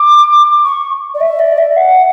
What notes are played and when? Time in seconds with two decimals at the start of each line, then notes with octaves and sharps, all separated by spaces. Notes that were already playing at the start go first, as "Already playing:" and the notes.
Already playing: D6
0.65 C#6
1.14 D5
1.20 E5
1.39 D5
1.58 E5
1.76 F#5